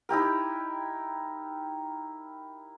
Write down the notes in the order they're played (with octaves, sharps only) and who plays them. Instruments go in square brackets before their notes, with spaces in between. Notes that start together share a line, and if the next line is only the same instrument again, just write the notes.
[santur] D#4 E4 G4 A#4